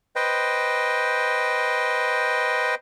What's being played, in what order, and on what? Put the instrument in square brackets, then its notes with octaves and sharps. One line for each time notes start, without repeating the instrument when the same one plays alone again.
[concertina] B4 C5 D#5 G5